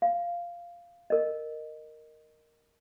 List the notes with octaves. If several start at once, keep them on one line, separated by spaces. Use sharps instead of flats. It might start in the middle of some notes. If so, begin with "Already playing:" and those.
F5
A#4 D#5